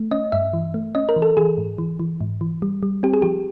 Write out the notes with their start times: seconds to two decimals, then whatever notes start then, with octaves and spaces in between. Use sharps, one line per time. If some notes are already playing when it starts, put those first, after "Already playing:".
Already playing: A3
0.11 C#4 D#5
0.32 G2 E5
0.53 E3
0.74 A3
0.95 C#4 D#5
1.09 A#4
1.16 E3
1.22 A4
1.37 E3 G#4
1.58 G#2
1.78 E3
2.00 E3
2.21 G#2
2.41 E3
2.62 G3
2.83 G3
3.03 C4 G4
3.14 G#4
3.22 F3 G4